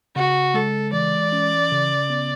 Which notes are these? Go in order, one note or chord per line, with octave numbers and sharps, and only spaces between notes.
C#3 F#4
G#3 A4
E3 D5
C#4
C#3
B3